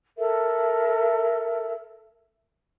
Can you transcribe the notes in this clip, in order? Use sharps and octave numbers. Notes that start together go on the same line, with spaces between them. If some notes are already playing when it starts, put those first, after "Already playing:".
A4 A#4 E5